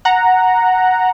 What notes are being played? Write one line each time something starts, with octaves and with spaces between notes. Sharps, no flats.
F#5 A#5